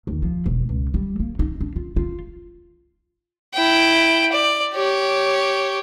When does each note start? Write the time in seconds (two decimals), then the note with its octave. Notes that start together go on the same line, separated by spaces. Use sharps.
0.07 D#2
0.22 F3
0.46 E1
0.69 C#2
0.94 G3
1.20 A#3
1.39 D#4
1.61 D4
1.76 F4
1.96 F4
3.54 E4 G5
4.32 D5
4.74 G4 C#5